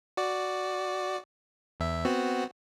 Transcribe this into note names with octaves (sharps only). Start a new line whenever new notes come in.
F#4 D5
E2 E5
B3 C4 F#4